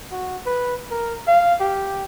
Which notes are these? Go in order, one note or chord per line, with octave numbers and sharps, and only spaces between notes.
F#4
B4
A#4
F5
G4